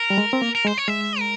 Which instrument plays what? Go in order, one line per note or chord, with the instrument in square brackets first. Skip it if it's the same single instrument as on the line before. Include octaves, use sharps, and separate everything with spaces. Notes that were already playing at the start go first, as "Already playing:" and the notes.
Already playing: [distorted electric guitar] A#4
[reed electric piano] G3
G#3
C4
A#3
[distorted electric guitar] A#4
[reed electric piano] G#3 [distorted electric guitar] C5
[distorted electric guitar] C#5
[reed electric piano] G#3 [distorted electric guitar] E5
[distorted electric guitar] A#4